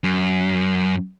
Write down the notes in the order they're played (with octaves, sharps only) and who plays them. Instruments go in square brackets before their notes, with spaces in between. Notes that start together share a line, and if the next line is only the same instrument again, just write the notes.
[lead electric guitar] F#2